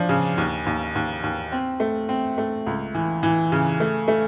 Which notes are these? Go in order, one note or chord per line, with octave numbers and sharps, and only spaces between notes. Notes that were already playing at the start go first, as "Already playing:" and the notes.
Already playing: F3 D4
C#3
D#2
D#2
D#2
D#2
C4
A3
C4
A3
C#2
E3
E3
C#3
A3
A3